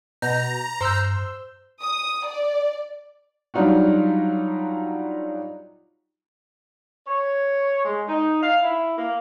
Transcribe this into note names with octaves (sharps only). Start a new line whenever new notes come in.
B2 A#5 G6
G2 C5 C6 E6 G6
D#6
D5
F#3 G3 D4 D#4 F4 F#4
C#5
G#3
D#4
F5
E4
A#3